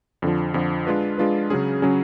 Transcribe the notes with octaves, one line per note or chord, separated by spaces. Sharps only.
F2 D3 F3
F2 D3 F3
G#3 D4 F4 B4
G#3 D4 F4 B4
C#3 F#3 C#4 G#4
C#3 F#3 C#4 G#4